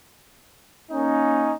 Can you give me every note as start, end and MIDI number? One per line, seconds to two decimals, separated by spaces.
0.91 1.52 58
0.91 1.52 61
0.91 1.52 63